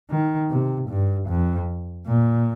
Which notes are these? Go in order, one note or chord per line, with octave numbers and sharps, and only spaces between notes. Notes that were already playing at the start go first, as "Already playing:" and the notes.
D#3
C3
G2
F2
A#2